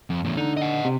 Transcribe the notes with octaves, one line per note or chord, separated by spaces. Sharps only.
F2
E2 A2
D3 D#4
D#5 F#5
C3